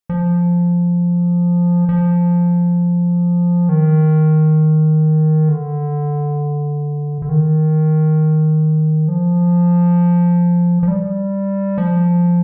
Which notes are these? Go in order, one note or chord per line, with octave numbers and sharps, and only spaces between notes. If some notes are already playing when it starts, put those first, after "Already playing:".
F3
F3
D#3
D3
D3
D#3
F3
F3
G3
F3